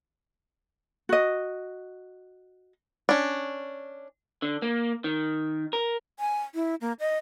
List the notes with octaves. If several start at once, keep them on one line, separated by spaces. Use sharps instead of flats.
F#4 D#5
C#4 D4
D3
A#3
D#3
A#4
G#5
E4
A#3
D#5